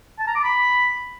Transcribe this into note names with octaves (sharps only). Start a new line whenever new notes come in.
A5
A#5
D6
B5